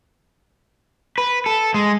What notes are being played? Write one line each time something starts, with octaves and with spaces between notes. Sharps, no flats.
B4
A4
G#3